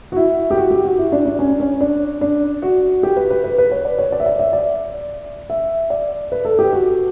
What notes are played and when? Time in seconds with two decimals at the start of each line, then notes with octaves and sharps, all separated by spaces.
0.12 F#4
0.16 E4
0.51 G4
0.58 F#4
0.71 G4
0.84 F#4
0.98 E4
1.12 D4
1.25 D4
1.39 C#4
1.49 D4
1.60 C#4
1.81 D4
2.21 D4
2.62 F#4
3.03 G4
3.16 B4
3.30 B4
3.44 B4
3.58 B4
3.72 C#5
3.85 D5
3.99 C#5
4.12 D5
4.20 E5
4.26 D5
4.39 E5
4.53 D5
5.50 E5
5.90 D5
6.32 B4
6.45 A4
6.59 G4
6.72 F#4